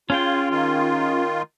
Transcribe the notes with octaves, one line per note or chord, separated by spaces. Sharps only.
C#4 F4 G#4 G5
D#3 F4